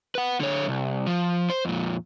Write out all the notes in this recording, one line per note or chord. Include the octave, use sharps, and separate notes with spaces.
B4 F#5
D3 C#5
C2
F3
C5
F2 A#2